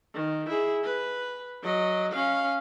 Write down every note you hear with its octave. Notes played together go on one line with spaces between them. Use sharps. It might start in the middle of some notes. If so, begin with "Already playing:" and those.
D#3
E4 G#4
B4
F#3 D#5
C#4 F5